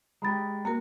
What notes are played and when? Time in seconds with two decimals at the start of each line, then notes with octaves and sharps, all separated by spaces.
0.22 G#3 G4 A#5 B5 A6
0.65 A#3 F#4 A#4